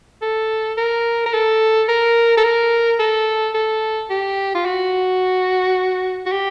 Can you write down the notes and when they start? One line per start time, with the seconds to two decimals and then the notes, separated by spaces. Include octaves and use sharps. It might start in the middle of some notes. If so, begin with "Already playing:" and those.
0.22 A4
0.78 A#4
1.26 A#4
1.34 A4
1.89 A#4
2.38 A4
2.44 A#4
2.99 A4
3.55 A4
4.10 G4
4.55 F4
4.66 F#4
6.26 F#4
6.32 G4